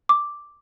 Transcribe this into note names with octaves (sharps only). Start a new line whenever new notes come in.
D6